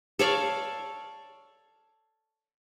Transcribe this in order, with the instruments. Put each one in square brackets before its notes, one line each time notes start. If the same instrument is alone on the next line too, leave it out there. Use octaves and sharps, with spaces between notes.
[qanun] A4 C#5 D5 F5